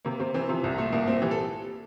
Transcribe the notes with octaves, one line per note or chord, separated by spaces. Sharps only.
C3 A#3
C3 C4
E3 C4
C3 F3
C2
A#2 A3
C2 A#3
A#2 C4
E3 G4
A4